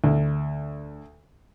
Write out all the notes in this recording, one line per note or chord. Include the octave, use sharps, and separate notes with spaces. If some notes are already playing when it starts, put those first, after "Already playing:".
D2